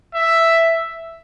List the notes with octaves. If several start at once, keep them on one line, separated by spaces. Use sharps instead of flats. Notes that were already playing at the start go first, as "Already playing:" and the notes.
E5